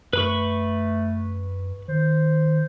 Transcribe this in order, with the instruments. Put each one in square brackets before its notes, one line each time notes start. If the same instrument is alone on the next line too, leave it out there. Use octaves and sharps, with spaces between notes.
[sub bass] F#2 [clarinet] A3 [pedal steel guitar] B4 B5 C#6
[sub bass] D#3 [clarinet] C5